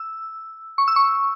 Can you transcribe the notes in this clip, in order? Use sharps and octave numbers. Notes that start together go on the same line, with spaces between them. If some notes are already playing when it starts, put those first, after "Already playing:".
Already playing: E6
C#6
E6
C#6